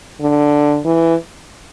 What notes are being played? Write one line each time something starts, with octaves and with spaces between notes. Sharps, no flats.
D3
E3